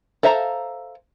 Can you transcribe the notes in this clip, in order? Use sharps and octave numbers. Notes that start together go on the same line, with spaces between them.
A4 C5 E5 F5 A#5